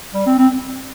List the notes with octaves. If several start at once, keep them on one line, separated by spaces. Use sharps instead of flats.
G3
C4
C4